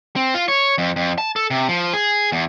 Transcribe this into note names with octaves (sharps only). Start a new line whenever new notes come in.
C4
F4
C#5
F2
F2
A5
A4
C3
F3
G#4
E2